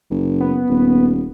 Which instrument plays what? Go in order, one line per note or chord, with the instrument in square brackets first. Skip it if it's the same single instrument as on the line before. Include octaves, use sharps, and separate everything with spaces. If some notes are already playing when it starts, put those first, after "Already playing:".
[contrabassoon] F#1
[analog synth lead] B3
[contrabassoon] D#1